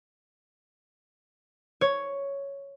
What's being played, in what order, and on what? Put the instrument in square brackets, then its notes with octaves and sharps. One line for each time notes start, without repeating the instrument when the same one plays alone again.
[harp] C#5